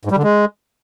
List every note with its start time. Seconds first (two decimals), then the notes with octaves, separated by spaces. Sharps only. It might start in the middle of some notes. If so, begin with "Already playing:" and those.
0.05 G#2
0.11 G3
0.17 D3
0.23 G#3